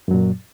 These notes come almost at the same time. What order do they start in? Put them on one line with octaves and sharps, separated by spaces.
F#2 F#3 A#2